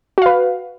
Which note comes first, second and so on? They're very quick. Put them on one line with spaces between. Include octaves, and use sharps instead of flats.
F#4 F5 B4